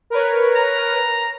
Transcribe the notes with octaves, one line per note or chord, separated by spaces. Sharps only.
A#4 B4 C#5
A#5